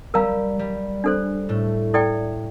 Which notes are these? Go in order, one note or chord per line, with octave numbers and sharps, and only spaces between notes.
G3 A#4 F5 A#5
G3
D4 A4 C5
A2 A3
E4 A4 D5 G5